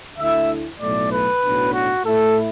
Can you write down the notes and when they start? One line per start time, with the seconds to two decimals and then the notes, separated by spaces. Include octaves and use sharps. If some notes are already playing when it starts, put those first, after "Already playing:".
0.18 D2 D3 A3 E4 E5
0.80 B1 A2 A3 D5
1.11 B4
1.43 B1 A2 F#3 D4
1.73 F#4
2.04 A2 A3 E4 A4